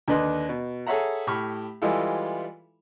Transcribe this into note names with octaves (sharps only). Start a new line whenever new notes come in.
D#2 D3 D4 B4 D#5 C6
B2
G#4 A4 C#5 E5 F#5 A#5
A2 G4 B5 C#6 F6
E3 G3 G#3 E4 F4 A4